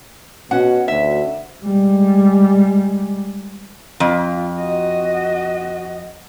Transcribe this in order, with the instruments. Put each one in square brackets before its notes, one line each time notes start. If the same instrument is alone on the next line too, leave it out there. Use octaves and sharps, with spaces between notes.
[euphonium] B2 [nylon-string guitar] C#4 F#4 [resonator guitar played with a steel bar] F#5
[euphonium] D2 [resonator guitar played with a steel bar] E5
[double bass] G3 G#3
[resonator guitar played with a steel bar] F2 [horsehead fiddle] F4
[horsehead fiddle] F#4 D#5